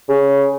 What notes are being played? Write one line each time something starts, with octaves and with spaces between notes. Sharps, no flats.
C#3